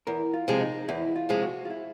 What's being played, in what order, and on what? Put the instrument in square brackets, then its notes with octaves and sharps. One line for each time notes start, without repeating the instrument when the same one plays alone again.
[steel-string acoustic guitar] E2 [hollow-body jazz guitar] A#4
[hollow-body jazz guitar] F4
[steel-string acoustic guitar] C3 F3 G#3
[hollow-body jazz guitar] D#4
[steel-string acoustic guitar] E2 [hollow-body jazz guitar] E4
[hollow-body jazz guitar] F4
[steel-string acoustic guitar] C3 F3 G#3
[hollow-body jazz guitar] F#4
F4
E4